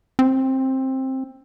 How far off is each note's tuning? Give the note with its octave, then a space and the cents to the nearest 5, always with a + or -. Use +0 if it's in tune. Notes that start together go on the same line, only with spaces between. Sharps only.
C4 +15